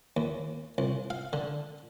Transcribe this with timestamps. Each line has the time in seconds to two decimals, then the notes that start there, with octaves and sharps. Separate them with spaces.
0.17 D#2
0.78 C2
1.10 F5
1.33 D3